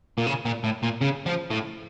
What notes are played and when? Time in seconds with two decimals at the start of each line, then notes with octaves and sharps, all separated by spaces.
0.18 A#2
0.27 C#3
0.46 A#2
0.64 A2
0.83 A#2
1.01 C#3
1.26 F3
1.50 A2